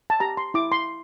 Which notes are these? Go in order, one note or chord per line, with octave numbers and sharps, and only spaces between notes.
A5
G4 A#5
C6
E4 D6
C6